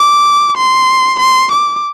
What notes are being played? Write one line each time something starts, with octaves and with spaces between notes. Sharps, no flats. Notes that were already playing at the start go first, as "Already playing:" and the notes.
Already playing: D6
C6
C6
D6